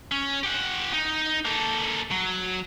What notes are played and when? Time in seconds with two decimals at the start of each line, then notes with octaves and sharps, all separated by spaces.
0.12 C#4
0.43 G4 F#5
0.93 D#4
1.45 A#3 A4
2.11 F#3